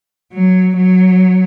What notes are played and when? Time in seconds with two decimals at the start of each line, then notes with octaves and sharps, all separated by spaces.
0.33 F#3
0.76 F#3